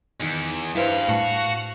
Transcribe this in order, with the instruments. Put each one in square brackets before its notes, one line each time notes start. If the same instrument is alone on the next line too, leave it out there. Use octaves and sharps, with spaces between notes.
[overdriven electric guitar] E2 [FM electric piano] D#3 D#4
[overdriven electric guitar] G2 [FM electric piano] E4 B4 C5 [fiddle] F5
[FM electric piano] A2 A5 [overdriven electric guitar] F#4